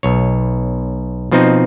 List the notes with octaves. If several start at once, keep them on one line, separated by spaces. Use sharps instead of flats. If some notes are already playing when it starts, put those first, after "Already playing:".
B1 C#5
B2 F3 C4 D#4